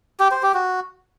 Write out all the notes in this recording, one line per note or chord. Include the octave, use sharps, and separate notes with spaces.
G4
C5
G4
F#4